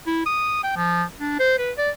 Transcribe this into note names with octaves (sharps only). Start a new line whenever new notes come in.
E4
D#6
G5
F3
D4
C5
B4
D5